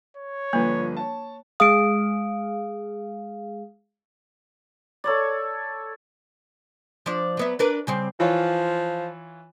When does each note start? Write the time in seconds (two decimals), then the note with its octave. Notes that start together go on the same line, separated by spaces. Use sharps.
0.17 C#5
0.53 G1 F3 A#3 B4
0.97 C#5 A5
1.60 G#3 G#4 F5 D#6 D7
5.04 A4 C#5 D5
7.06 F3 D4
7.37 F#3 B3 E5
7.59 D4 A#4 B4
7.87 C#3 G3 C4
8.20 E3 F3 F4 C#5